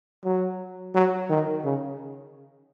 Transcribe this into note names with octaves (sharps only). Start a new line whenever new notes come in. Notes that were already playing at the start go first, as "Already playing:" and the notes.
F#3
F#3
D#3
C#3